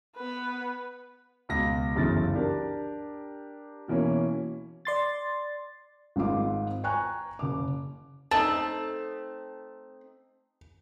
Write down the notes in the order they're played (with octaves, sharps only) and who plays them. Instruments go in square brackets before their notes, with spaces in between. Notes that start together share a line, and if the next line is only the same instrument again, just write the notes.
[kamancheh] B3 B4
[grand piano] C#2 B2 A#6
G1 F#2 C#3 E3 A6
D4 G4 A#4
B2 E3 A#3 C#4
[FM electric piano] D5 C6 A6
[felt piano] G#1 G#2 C4 F4 D6
G5 G#5 A#5 C#6 F#6
F#1 D6
[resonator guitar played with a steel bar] A3 D#4 [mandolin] C4 [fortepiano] A5